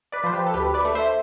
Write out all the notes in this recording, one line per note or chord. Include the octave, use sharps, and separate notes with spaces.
B4 D5
F3 C5
G4 B4
A4
D2 G4 B4
B4 D5
A3
C5 E5